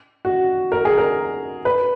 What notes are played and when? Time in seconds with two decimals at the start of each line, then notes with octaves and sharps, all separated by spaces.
0.25 F#4
0.72 A#4
0.85 G#4
0.98 A#4
1.65 B4